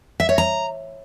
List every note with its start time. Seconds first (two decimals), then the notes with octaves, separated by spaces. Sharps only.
0.20 E5
0.29 C#5
0.38 A#5